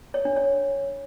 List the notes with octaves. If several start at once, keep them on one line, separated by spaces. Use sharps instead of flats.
C#5
D4
C#5